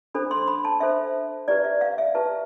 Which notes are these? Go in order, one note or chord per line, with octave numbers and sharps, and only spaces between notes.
D4 A4 C5 B5
C6
B5
A5
D4 A4 C5 E5
E4 G4 B4 D5
E5
F5
E5
E4 G4 B4 A5